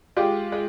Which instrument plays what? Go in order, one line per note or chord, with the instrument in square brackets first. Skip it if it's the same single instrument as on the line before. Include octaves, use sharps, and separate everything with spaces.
[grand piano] G#3 F4 G4
G#3